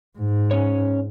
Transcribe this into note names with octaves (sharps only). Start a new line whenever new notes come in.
G#2
C#4 C#5